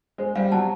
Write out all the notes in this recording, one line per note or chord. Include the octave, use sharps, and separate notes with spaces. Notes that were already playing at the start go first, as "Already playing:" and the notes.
G#3 C5
G3 F5
F#3 A5